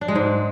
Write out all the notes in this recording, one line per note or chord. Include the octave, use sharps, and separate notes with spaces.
D4
G#3
G#2